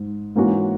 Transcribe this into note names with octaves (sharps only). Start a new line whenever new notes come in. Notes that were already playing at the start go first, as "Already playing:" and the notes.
Already playing: G#2
G#2 E3 A#3 C#4 F#4